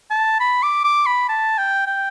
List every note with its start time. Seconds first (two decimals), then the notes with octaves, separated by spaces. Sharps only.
0.10 A5
0.40 B5
0.63 D6
0.84 D6
1.06 B5
1.29 A5
1.58 G5
1.87 G5